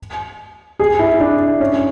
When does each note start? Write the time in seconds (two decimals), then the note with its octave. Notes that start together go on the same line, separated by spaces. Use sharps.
0.79 G#4
0.99 E4
1.20 D4
1.60 C#4